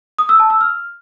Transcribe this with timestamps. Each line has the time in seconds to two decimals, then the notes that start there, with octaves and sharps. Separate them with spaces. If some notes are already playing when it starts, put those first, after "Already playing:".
0.19 D#6
0.29 E6
0.40 A5
0.50 E6
0.61 F6